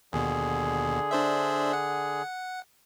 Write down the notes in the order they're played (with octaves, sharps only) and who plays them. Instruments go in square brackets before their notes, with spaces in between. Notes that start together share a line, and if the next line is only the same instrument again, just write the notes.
[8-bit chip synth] D#2 B2 [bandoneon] D3 G#4
[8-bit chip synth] D4 C5 E5
F#5